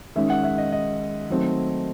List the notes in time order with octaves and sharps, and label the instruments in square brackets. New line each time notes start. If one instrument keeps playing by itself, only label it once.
[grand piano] D#3 G#3 C#4 E5
F#5
E5
D#5
D#5
D#3 F#3 A3 C4